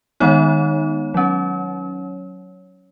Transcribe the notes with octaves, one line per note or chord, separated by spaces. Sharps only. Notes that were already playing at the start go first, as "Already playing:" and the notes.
D#3 G#3 B3 D#4 C#5
F#3 C#4